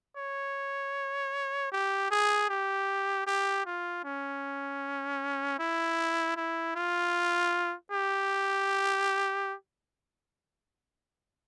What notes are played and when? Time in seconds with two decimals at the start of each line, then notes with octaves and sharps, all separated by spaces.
0.17 C#5
1.72 G4
2.11 G#4
2.49 G4
3.27 G4
3.66 F4
4.04 C#4
5.59 E4
6.36 E4
6.76 F4
7.92 G4